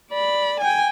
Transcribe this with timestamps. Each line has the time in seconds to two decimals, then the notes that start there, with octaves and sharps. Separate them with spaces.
0.11 D5 B5
0.61 G5 G#5